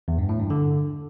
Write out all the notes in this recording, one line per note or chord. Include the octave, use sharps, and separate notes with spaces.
E2
G2
A2
G2
D3